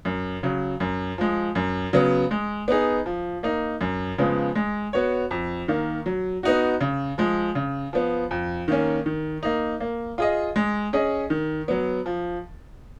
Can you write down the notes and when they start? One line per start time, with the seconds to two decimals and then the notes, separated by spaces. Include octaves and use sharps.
0.05 F#2
0.43 C#3 F#3
0.80 F#2
1.18 F3 G#3
1.55 F#2
1.93 C#3 F#3 B3
2.31 G#3
2.68 B3 D#4 G#4
3.06 F3
3.43 A#3 D#4
3.81 F#2
4.18 C#3 F3 G#3 B3
4.55 G#3
4.93 B3 F#4 C#5
5.31 F2
5.68 D#3 A#3
6.06 F#3
6.43 B3 D#4 F#4
6.81 C#3
7.18 F3 G#3
7.55 C#3
7.93 F3 B3
8.31 F2
8.68 D#3 A#3 C#4
9.06 D#3
9.43 A#3 D#4
9.80 A#3
10.18 F4 G#4 D#5
10.56 G#3
10.93 C#4 G#4 D#5
11.30 D#3
11.68 F#3 B3
12.06 F3